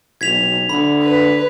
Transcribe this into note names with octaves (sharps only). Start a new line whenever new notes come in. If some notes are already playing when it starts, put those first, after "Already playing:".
B1 G#6 B6 F7
D3 B5
B4